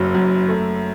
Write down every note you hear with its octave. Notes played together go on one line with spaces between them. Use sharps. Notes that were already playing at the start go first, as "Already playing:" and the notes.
Already playing: F#1 F#2 F#3
F#2
A3